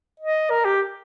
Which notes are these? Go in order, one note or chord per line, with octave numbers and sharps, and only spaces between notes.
D#5
A#4
G4